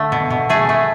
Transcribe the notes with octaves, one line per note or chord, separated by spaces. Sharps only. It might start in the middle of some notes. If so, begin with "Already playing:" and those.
Already playing: D3 A3
B2
B2
A3 G#4
A3